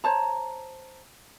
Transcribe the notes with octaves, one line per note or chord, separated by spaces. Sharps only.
C5 C#5 A5 A#5